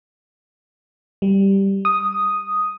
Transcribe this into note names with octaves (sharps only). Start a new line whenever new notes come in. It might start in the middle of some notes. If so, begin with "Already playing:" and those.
G3
D#6